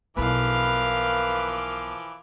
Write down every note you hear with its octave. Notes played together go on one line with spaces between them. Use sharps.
B1 E3 F3 E4 A#4 B4 F5 D6